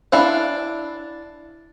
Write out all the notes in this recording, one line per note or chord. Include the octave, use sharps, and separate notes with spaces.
D4 E4 F5 F#5